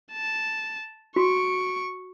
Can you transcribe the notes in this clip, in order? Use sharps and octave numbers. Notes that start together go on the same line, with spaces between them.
A5
F#4 C#6 D7